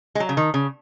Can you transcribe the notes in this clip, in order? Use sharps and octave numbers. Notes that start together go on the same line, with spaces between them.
G#3
F#3
C#3
D#3
C#3